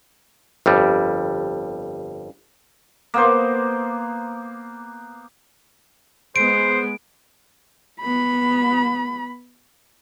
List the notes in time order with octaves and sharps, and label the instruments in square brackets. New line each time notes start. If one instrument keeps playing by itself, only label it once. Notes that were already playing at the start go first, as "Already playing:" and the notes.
[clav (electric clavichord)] G1 F2 G3
[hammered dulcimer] A#3 B3 C5
[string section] G#3 B3 [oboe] C5 [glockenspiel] D7
[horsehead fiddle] B3 B5